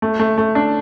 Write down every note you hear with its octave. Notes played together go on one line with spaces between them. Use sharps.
A3
A3
A3
D4